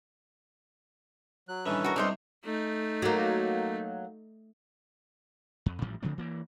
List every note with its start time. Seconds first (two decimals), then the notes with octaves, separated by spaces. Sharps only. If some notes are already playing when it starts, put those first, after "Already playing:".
1.49 F#3 F#6
1.66 G2 D#3 E3 C#4 A4 B4
1.84 F#4 A#4
1.96 C2 C3 D4 D#4 C5
2.44 A3 D#4
3.02 F#3 A#3
5.66 F2
5.81 A1 A2 F3 G3
6.03 C#3 F3 A3 C4
6.18 E3 A#3